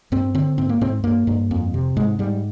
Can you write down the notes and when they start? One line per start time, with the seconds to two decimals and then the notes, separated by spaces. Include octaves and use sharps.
0.12 G2 C4
0.35 D3 C4
0.58 G#2 C4
0.69 A#3
0.81 G#2 C4
1.04 G2 A#3
1.27 G2
1.51 F2
1.74 C3
1.97 G#2 G#3
2.19 G#2 G3